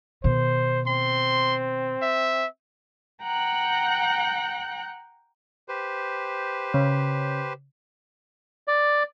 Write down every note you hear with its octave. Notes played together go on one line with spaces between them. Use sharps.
B2 D#3 C5
C4 C6
E5
F#5 G5 A#5 F#6
G4 B4 C5
C#3
D5